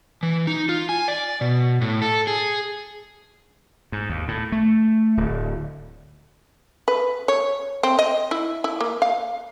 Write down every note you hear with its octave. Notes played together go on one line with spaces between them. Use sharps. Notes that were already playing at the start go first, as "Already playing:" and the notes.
E3
D#4
F4
G#5
D5
B2
A2
A4
G#4
G#2
D#2
A2
A3
D1
B4
C#5
C4
D#5
E4
E4
A#3
F5